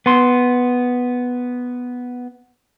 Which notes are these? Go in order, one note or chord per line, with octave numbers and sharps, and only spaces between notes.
B3 C6